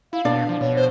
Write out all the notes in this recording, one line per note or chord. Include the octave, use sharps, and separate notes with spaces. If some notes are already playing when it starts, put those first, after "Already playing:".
E4 F5
B2 D4 D5
F3
B2 C#5
C5